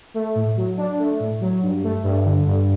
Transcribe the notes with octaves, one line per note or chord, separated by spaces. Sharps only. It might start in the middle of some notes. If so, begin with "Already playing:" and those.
A3
A2
F#3
D4
A3
A2
F#3
G2
A3
G2
D3
G2